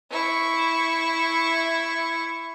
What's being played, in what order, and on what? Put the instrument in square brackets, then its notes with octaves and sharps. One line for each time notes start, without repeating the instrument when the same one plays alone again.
[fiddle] E4 C#6